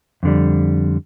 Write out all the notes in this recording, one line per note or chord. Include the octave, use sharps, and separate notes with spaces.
F2 D3 G3